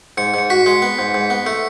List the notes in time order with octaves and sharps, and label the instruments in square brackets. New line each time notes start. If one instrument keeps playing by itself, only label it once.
[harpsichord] G#2 [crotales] C#7
[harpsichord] G#2 [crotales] C#7
[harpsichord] F#4 [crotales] B6
[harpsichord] G#3
B3
G#2
G#2
B3
[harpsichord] A3 [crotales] C#7